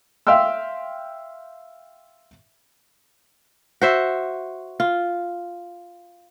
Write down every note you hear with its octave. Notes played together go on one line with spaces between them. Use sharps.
E5 F5 G5 C6 E6
F#4 C5 E5
F4